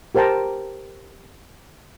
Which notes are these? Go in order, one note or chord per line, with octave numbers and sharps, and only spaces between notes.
G4 A#4 C5 G5 A5 A#5